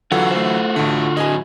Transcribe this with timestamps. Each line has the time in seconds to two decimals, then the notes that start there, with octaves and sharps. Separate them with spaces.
0.12 E2 D3 E3 F#3 F4 F#4 A4 F#5
0.31 A3 C5
0.76 A1 D3 A3
1.17 A2 F#3 D#5 G#5